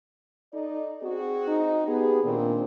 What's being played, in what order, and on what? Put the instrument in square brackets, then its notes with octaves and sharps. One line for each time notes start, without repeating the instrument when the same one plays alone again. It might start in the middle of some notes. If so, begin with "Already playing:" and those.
[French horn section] D#4 A4 D5
C4 F#4 G#4
[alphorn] D#4
[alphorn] B3 [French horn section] G4 G#4
[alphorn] A#2 [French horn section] D#3 C4 D4